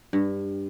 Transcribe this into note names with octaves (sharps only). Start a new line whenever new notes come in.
G2